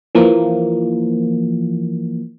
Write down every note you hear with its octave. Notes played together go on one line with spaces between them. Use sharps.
E3 F3 A#3